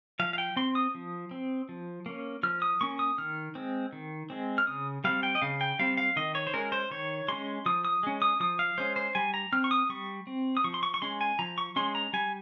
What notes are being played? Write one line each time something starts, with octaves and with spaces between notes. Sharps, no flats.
F3 F5
F5
G5
C4 C6
D#6
F3
C4
F3
A#3 C#4
F3 F6
D#6
A#3 C#4 C#6
D#6
D#3 F6
G#3 C4
D#3
G#3 C4
F6
C#3 D#6
G3 C4 F5
G5
D#5
C#3 F5
G5
G3 C4 F5
F5
D#3 D#5
C#5
C5
G#3 C#4 A#4
C5
D#3 C#5
G#3 C#4 C6
F3 D#6
D#6
G#3 C#4
D#6
F3 D#6
F5
G#3 C#4 C5
C5
G3 G#5
A#5
C4 F6
C#6
D#6
G3 C#6
C4
D#6
F3 C#6
C6
C#6
C#6
G#3 C#4 C6
G#5
F3 A#5
C#6
G#3 C#4 C6
A#5
G3 G#5